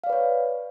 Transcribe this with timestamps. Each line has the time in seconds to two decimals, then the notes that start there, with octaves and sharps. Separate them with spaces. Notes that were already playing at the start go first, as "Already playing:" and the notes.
0.04 F5
0.07 D5
0.10 B4
0.13 C#5